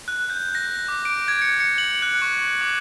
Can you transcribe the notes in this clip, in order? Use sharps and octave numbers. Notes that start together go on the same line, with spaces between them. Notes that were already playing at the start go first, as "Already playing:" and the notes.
F#6
G6
A#6
D6
D7
G#6
C#7
C#7
F#7
F#6
C#6
D6